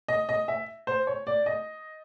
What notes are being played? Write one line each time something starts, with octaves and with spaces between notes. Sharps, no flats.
D#5
D#5
E5
C5
C#5
D5
D#5